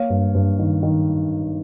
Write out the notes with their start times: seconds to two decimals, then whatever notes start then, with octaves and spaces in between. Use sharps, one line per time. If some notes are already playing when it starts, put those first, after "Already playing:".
Already playing: A#3 C#5 F5
0.10 G2
0.35 G2
0.59 D#3
0.83 D#3